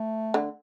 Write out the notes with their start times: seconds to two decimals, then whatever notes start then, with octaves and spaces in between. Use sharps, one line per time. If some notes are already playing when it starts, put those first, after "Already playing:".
Already playing: A3
0.34 D3